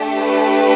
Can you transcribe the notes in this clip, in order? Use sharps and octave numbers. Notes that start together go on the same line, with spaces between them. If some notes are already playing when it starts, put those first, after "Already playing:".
Already playing: A3 D4 G4
B4